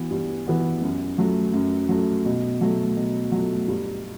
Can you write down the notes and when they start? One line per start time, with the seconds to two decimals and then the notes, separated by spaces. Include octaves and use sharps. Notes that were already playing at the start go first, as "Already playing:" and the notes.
Already playing: E3 B3 F#4
0.10 G2
0.46 E3 B3 F#4
0.81 F#2
1.18 F#3 A3
1.53 F#2
1.89 F#3 A3
2.25 B2
2.61 F#3 A3
2.96 B2
3.32 F#3 A3
3.68 G2